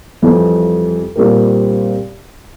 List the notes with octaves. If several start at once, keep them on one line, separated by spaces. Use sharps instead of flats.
F2 E3 G3
A#2 G3 C4 G4 A#4